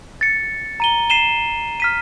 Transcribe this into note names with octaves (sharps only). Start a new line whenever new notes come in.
A6 C#7
A#5 D#7 G7
C7 D#7 E7 G7
F6 B6 D#7